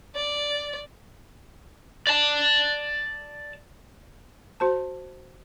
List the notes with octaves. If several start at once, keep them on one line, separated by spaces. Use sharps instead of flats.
D5
D5 A5
F#4 C5 A5